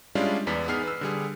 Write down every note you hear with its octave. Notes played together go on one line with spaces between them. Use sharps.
G3 G#3 C#4 D4 E4 F4
E2 B3 D5 B6
B3 D#4 G#4 F6 C7
B4 E6
D3 G3 G#4